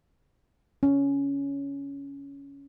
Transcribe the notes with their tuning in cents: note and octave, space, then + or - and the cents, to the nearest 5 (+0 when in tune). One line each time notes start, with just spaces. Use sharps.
C#4 +10